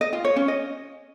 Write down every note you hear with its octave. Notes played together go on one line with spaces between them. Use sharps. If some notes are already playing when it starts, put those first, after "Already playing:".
D#5
F4
C#5
C#4
D#5